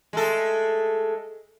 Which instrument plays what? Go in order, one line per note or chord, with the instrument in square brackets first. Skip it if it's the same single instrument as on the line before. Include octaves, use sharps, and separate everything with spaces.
[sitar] G#3 A3 A4